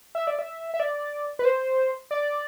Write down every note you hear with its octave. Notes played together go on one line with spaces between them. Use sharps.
E5
D5
E5
E5
D5
B4
C5
D5